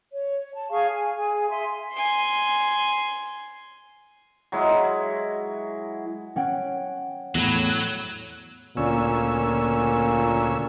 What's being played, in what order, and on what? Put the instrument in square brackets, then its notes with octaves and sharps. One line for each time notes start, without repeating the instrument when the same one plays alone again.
[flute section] C#5
A5
G#4 F5 C#6
G#5
G#4 G#5
E5 G#5 C6
[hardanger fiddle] G#5 C6
[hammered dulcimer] F#3 G#3 E4
[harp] C#4 F#5 G5
[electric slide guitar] E2 A2 [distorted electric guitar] F#3 [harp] B5 G#6 A#6
[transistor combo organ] D2 C#4 E6 [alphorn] A#2